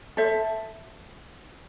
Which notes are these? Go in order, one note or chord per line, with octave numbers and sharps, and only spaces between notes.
A4 C5 E5